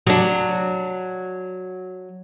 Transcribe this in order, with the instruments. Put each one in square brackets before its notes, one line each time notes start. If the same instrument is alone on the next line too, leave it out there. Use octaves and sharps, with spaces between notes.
[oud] F#3 D4